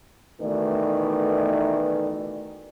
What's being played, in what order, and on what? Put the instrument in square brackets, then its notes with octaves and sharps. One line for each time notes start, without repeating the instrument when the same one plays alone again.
[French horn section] B2 D#3 E3 A3 B4 D5